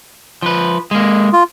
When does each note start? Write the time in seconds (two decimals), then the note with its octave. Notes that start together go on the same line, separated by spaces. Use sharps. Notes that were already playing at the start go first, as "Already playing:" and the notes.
0.42 F3 B4
0.91 G#3 A#3
1.33 F4